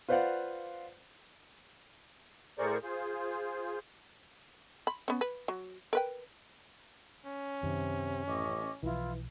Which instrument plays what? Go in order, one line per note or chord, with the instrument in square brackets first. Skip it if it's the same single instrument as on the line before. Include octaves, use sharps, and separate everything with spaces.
[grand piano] F4 B4 C5 D5 F5 F#5
[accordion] A2 G#4 A#4 C5 D5 C#6
F4 G#4 C5
[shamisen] B5
B3 C#4
B4
F#3
A#4 B4 G5
[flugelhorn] C#4
[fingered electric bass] F#2 D#3 [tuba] C3
[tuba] A1 [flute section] D#5 C#6 D6
[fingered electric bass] B1 F3 [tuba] E3 [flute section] E4 F4